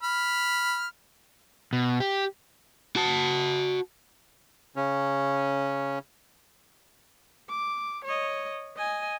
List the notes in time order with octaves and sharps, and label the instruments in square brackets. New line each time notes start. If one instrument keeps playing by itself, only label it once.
[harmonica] B5 F6
[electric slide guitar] B2
G4
[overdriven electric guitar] F#4 A5
[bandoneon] C#3 C#4
[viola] D6
C#5 D#5
D#5 G#5